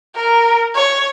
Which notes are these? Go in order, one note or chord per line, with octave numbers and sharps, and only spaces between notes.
A#4
C#5